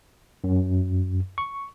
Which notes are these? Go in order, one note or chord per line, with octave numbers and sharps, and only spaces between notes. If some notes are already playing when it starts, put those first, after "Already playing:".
F#2
C#6